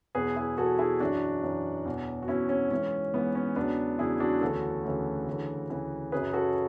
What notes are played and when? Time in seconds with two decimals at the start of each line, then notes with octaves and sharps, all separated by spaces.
0.15 E2 B2 F#3 G#4 B4
0.36 E4 G#4
0.58 E2 B2 F#3 F#4 A4
0.79 E4 G#4
1.00 F#2 E3 D4 F#4
1.43 F#2 E3
1.85 E2 B2 F#3
2.23 F#4
2.28 E2 B2 F#3 C#4 E4
2.49 C#4
2.71 G#2 E3 C#4
3.14 G#2 E3 B3
3.35 C#4
3.56 E2 C#3 F#3 B3 D4
3.99 E2 C#3 F#3 E4 G#4
4.20 D4 F#4
4.41 D2 C#3 E3 F#4 A4
4.84 D2 C#3 E3
5.27 D2 C#3 E3
5.69 D2 C#3 E3
6.12 F#2 C#3 F#3 G#4 B4
6.33 F#4 A4